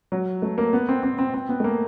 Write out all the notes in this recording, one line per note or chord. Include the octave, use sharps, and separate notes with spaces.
F#3
A3
A#3
B3
C4
C4
C4
C4
B3
A3
A#3